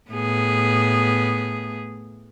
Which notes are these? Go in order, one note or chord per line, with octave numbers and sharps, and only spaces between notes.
A2 B3 G#4